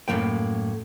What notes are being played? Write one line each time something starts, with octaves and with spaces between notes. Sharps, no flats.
F#2 A2 F3 A#3 G5